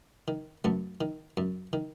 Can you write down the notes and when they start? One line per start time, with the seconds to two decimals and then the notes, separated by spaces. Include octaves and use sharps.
0.28 D#3
0.64 F#2 A3 B3
1.01 D#3
1.37 F#2
1.73 D#3